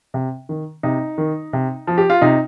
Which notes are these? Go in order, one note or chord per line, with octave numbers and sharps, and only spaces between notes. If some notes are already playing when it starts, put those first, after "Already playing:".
C3
D#3
C3 D#4
D#3
C3
F3
G4
F4
C3 D#4